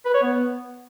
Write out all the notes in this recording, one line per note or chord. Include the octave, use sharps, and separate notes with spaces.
B4
C#5
B3